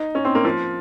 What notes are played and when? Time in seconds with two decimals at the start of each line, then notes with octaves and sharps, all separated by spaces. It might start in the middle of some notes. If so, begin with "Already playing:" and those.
Already playing: D#4
0.15 C#4
0.25 C4
0.35 A#3
0.45 F3